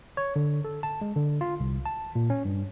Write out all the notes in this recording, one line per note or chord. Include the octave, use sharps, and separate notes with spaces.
C#5
D3
A4
A5
G#3
D3
F4
C2
A5
A#2
C#4
G2